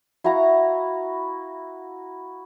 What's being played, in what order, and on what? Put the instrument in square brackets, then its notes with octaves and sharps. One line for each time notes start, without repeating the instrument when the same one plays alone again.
[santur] E4 F#4 F5 A#5